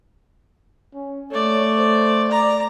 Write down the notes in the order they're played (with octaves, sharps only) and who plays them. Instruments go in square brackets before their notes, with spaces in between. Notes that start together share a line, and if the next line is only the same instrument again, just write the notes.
[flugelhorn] C#4
[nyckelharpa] A3 D5 [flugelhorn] C#5
[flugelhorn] C5
[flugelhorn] D5 [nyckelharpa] A#5